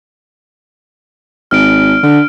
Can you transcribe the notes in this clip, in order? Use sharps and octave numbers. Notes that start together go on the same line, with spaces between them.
G#1 F6 D7
D3